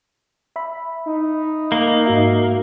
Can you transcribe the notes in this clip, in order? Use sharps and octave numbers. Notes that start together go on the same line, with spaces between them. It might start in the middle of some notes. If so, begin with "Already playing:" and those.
E5 B5
D#4
A#3
G#2 F#4 E5